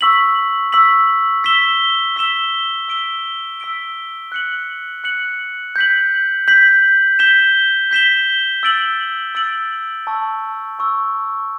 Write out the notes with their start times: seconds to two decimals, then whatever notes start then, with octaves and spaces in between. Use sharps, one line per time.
0.01 C#6 E6 B6 F#7
0.72 C#6 E6 B6 F#7
1.44 E6 B6 E7 G7
2.16 E6 B6 E7 G7
2.88 E6 B6 D7 G7
3.60 E6 B6 D7 G7
4.32 F#6 C#7 F#7
5.04 F#6 C#7 F#7
5.76 G6 B6 F#7
6.48 G6 B6 F#7
7.19 G6 B6 E7 G7
7.91 G6 B6 E7 G7
8.63 E6 A6 D7 F#7
9.35 E6 A6 D7 F#7
10.07 A5 C#6 E6
10.79 A5 C#6 E6